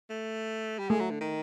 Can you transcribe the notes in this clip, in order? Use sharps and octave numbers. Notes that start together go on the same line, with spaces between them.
A3
G3
G#3 A3
F#3
D3
D#3